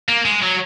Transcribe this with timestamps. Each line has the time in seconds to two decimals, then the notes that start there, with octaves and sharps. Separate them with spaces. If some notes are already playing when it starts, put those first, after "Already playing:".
0.09 A#3
0.25 G#3
0.43 F#3